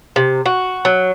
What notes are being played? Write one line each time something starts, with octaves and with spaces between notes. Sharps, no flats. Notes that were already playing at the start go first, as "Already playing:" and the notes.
C3
F#4
F#3